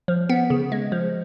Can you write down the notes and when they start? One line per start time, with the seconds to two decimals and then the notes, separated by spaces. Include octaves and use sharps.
0.08 F3
0.29 B3
0.50 C#3
0.72 G#3
0.92 F3